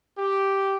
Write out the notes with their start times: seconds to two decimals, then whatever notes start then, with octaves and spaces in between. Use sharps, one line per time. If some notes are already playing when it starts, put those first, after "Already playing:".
0.18 G4